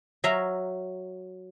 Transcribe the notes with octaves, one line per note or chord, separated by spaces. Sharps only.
F#3 E5 F5 A#5